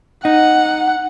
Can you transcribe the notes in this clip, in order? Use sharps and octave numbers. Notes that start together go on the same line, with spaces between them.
D#4 F#5